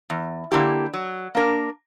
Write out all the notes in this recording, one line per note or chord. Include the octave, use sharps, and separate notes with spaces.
E2
D3 A#3 E4 G4
F#3
A#3 D4 A#4